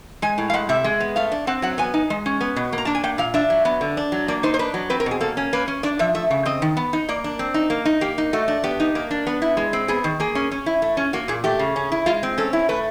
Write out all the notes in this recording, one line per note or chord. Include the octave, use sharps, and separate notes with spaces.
G#3 G#5
A2
F5
G#3 F#5
C3 E5
G#3
B3
A3 F5
D4
C4 F#5
F#3 F#5
B3 G#5
D#4
G#3
C#4
B3
B2
A#3
A#5
D4 A5
G#5
A#3 G5
A#2 F5
D4 E5
F#3
B3
D3
D4
F#3
A#3 D5
D#4 C5
C5
D4 B4
F#3
C4 B4
A#4
B2 G#4
A#3 A4
C#4
A#3 B4
C#4
D4 D5
F3 E5
A3 E5
C#3
C4 D#5
D#3
B3
D#4
A#3 D5
D4
C4
D#4
A#3
D#4
A#3 G4
D#4
A3 F#4
D4
B3 G4
D#4
A#3
D4
B3
E4
G#3
C4
B3 G#4
D#3
A#3 G#4
C#4
C#4
E4
A3
C#4
A#3 F#4
A#2 G#4
A3 G4
C#3
C#4
E4
G#3 F4
C4
C#4 A4
E4
A3 B4